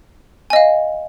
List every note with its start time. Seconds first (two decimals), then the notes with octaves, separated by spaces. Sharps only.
0.50 G#5
0.53 D#5
0.56 F5